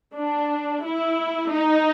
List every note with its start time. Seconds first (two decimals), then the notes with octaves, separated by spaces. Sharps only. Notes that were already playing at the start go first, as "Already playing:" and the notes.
0.16 D4
0.83 E4
1.51 D#4